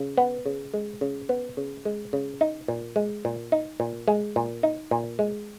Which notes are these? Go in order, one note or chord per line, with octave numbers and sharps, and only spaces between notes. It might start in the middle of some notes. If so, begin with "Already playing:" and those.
Already playing: C#3
B3
C#3
G#3
C#3
B3
C#3
G#3
C#3
D#4
A#2
G#3
A#2
D#4
A#2
G#3
A#2
D#4
A#2
G#3